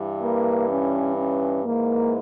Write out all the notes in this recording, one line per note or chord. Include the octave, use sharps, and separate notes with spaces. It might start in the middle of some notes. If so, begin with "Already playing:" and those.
Already playing: G2 E3
A#3
C#4
C#4
G#2 E3 A#3